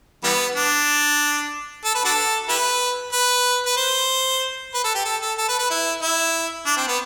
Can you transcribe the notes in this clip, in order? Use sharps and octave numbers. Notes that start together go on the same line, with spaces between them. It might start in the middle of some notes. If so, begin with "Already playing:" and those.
E3 G3 B3
D4
A4
B4
D4 F#4 A4
E4 G4 B4
B4
B4
C5
B4
A4
G4
A4
A4
A4
B4
B4
E4
E4
D4
C4
B3